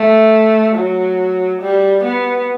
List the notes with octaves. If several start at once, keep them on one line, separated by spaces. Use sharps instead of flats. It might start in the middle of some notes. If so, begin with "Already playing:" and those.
Already playing: A3
F#3
G3
B3